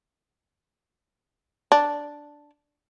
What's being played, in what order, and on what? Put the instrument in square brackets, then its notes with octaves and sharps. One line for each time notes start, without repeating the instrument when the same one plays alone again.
[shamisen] D4